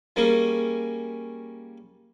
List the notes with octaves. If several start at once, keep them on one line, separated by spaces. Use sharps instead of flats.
G3 A#3 C#4 G#4